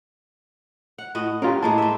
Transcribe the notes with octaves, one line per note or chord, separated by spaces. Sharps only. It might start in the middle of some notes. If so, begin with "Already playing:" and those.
F#5
A2 F#4 D#5
C#4 F4 G4 A#4
A2 G#3 A#3 A5
C4 E5